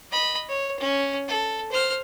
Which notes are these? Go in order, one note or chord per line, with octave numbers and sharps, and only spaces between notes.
D#5 B5
C#5
C#4
A4
C5 F6